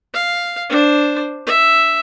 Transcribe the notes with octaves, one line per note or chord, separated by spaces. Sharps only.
F5
D4 C5
E5